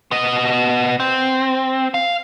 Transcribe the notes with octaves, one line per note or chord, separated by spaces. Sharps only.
B3 D#5
C4
F5